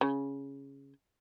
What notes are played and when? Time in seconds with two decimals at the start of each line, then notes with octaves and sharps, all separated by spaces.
0.01 C#3